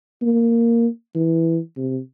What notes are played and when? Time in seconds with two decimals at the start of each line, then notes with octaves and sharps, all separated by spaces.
0.22 A#3
1.15 E3
1.77 C3